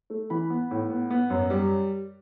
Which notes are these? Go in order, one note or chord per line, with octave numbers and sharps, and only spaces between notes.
A3
E3 B5
B3
A2
B3
B3
F#2
G3